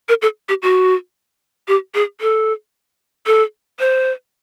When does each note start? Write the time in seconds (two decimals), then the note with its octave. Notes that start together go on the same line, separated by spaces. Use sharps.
0.09 A#4
0.22 A4
0.49 G4
0.63 F#4
1.68 G4
1.94 G#4
2.21 A4
3.27 A4
3.80 C5